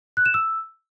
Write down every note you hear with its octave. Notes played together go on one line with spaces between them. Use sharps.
F#6
E7
E6